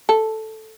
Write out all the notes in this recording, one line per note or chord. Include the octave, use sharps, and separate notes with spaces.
A4